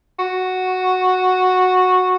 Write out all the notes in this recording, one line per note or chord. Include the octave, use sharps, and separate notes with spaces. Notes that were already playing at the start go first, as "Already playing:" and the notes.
F#4